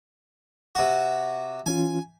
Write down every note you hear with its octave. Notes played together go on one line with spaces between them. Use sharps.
C3 F#4
E3 C#4 F4 G#5